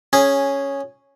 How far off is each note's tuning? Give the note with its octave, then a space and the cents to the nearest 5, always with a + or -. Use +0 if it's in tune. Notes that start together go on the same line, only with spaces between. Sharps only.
C#4 +0 G#4 -5